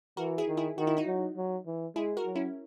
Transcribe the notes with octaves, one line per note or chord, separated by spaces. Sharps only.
E3 F#4 A#4
E4 G#4
D#3
E4 G#4
D#3 F#4
E4
D#4 F#4
F#3
F#3
E3
G#3 E4 G#4
F#4 A#4
F#3
C#4 E4